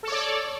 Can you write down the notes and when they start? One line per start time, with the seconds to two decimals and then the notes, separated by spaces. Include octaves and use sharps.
0.03 A4
0.07 C#5
0.12 D5